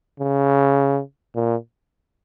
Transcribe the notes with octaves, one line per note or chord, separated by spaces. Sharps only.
C#3
A#2